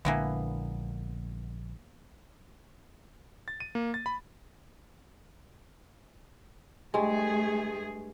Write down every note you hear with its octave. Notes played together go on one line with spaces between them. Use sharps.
A#1 D3 E3 G#3 A#3 B3
A6
D#7
A#3
A6
B5
G2 G#3 A3 G#4